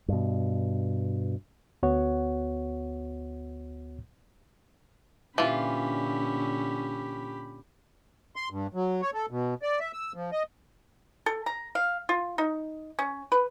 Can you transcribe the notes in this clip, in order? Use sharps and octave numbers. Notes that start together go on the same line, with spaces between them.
G2 B2
D2 B3 F#4 C#5 F#5
A#2 D3 E3 C#4 F4 G4 B5
C6
G2
F#3
C#5
A4
B2
D5
E5
E6
F3
D#5
A4
A#5
F5
F4
D#4
C#4
B4